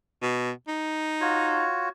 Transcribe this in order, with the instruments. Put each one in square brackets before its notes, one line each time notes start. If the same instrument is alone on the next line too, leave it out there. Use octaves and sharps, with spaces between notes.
[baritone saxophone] B2
D#4
[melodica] F4 F#4 C#5